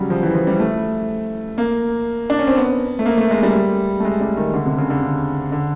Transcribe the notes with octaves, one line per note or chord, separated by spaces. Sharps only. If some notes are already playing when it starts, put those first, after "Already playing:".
Already playing: C#3 F#3 G3
F3
E3
F3
G3
A3
A#3
D4
C#4
C4
B3
A3
A#3
A3
G#3
G3
A3
G#3
G3
D#3
D3
C3
C#3
D3
C#3
D3